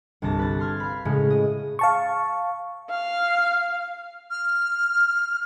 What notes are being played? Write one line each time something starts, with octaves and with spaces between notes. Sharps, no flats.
G1 C2 A5 A#6
B4 A6
C6 F6 G#6
F5 B5
A2 C#3 G#3 C#4
D#5
F5 A5 C#6
F5
F6